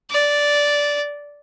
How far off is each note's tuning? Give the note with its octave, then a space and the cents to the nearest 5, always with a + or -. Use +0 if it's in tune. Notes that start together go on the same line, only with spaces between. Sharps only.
D5 -10